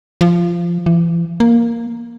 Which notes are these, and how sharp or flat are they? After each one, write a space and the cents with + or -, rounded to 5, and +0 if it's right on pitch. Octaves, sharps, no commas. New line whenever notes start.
F3 -15
E3 +40
A#3 +0